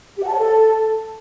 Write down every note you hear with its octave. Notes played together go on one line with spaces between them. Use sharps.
G4
F#5
A5
C#5
A4